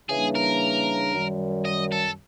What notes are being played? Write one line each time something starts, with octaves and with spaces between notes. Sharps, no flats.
C#3 E3 G3 A#3 D4 G#4
A#4
F#2 D#3 G3
D#5
A4